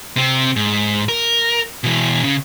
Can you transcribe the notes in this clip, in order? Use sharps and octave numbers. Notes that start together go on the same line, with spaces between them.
C3 C4
G#2
A#4
B2 E3
C#3